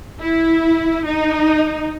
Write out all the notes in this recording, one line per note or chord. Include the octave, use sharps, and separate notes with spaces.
E4
D#4